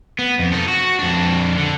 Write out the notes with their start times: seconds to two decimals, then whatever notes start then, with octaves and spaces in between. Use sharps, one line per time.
0.19 B3
0.39 F2
0.53 D#4 A4
0.68 F#4
0.99 F2 D4
1.58 D3